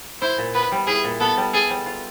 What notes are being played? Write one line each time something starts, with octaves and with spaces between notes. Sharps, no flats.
E4 C5
A#2
B3 B4
G3
E4 G#4
A#2
B3 A4
G3
G#4 A4
G3
F4